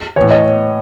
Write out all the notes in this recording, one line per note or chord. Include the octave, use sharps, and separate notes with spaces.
A2 E3 C#5
C#5 D#5